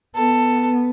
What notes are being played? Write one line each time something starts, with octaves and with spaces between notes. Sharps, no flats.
B3 A4